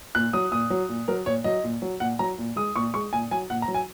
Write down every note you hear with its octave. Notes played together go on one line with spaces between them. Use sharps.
A#2 F#6
F#3 D#6
A#2 D#6
F#3
A#2
F#3 A#4
A#2 C#5
F#3 D#5
A#2
F#3
A#2 F#5
F#3 A#5
A#2
G#3 D#6
A#2 C#6
G#3 C#6
A#2 G#5
F#3 G#5
A#2 F#5
A#5
F#3
G#5